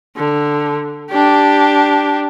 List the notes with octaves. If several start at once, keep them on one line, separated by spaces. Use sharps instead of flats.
D3
D4 G4